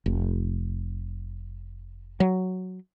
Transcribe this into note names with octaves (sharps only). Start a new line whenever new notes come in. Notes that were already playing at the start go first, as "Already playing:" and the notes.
F1
F#3